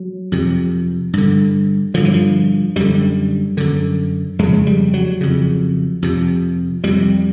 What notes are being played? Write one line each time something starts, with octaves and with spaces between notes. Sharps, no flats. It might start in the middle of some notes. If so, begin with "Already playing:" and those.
Already playing: F#3
F2 C3
G2 D3
G2 D3 F3
E3
F3
F#2 D3 G3
F#2 D3
F2 C#3 G#3
G3
F#3
F2 C#3
F2 C3
F2 C3 G3